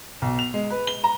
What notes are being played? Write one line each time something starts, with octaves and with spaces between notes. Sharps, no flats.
B1
F7
G#3
B4
G7
A#5